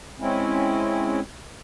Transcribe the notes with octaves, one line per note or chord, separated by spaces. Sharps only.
G#3 C4 C#4 E4